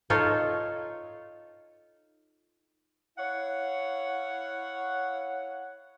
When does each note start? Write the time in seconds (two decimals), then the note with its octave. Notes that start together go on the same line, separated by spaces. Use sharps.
0.10 D#4 F4 A4 C#5
3.17 E4 C#5 F5 F#5